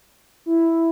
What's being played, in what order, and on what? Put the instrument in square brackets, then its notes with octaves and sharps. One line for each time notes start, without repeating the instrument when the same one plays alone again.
[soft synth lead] E4